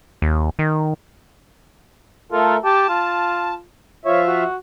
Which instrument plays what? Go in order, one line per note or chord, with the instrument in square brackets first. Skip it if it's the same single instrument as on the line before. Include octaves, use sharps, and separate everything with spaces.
[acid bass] D#2
D#3
[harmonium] A3 A4 A#4 [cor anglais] F4
[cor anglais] G4 [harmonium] A5
[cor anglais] F4
[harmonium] F3 F4 E5 [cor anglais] C#5
[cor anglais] F#4